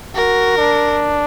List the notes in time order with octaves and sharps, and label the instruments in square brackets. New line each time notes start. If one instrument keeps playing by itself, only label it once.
[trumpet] F#4 [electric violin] A#4
[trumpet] D4